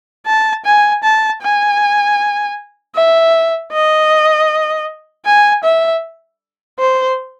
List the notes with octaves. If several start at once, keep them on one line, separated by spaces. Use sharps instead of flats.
A5
G#5
A5
G#5
E5
D#5
G#5
E5
C5